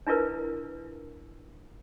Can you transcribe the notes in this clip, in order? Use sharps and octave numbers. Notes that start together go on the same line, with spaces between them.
D4 E4 F4 A#4 B4